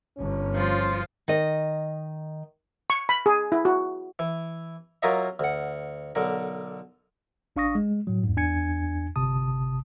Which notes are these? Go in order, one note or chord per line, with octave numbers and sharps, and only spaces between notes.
G1 C#4
F3 F4
D#3 D#5
C#6
B5
G#4
E4
F#4
E3
F#3 A#3 F4 A#4 D#5 E5
D2 F#5
B1 D3 A#4
A1 D4 F5 C#6 D#6 A#6
G#3
A2 F#3
E2 G#2
E2 D4 G#5 G#6 C#7
G1 C3 A5 D#6